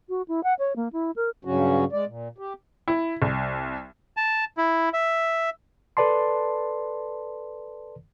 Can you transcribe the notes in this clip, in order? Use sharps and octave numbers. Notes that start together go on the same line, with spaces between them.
F#4
E4
F#5
C#5
A#3
E4
A#4
G2 C#3 F#3 C#4 F#4
G#3 D5
A#2
G4
E4
C2
A5
E4
E5
A4 B4 D5 A5 C6